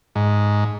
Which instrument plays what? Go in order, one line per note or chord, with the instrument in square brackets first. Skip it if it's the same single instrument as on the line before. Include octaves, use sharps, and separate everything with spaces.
[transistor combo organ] G#2